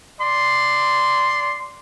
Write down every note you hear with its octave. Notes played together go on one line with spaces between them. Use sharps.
D5 C6